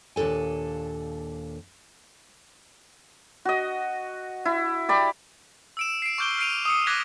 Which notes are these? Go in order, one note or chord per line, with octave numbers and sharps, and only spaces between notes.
D#2 A#2 D4 A4 G#5
F#4 D#5
E4
G4 D5 B5
E6 D7 E7
C7 D7
C#6 D6 F6 G6 D7 G7
F6 C7 D7 D#7 F7
D#6 E6 C#7
D6 F#6 G#6 A#6 B6 D#7